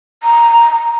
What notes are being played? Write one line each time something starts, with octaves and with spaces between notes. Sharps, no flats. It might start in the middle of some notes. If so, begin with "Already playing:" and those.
A#5